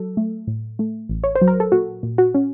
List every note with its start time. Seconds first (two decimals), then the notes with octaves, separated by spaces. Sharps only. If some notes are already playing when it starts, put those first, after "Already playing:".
Already playing: F#3 A4
0.17 A3
0.47 A2
0.79 A3
1.09 A1
1.24 C#5
1.35 C5
1.41 F#3
1.48 A#4
1.60 A4
1.72 A#2 F#4
2.03 A#2
2.18 F#4
2.35 C#4